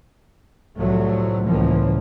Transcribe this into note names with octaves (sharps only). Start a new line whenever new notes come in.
C2 A2 F3 F#3 A3
C#2 A2 E3 F3 A#3